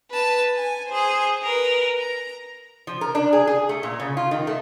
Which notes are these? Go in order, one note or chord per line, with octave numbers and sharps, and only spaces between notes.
B4 A5
G#5
G#4 C5
A#4 B4
A#5
F3
A#4
D4
G#4
G#4
A3
A#2
C#3
F4
D#3
A3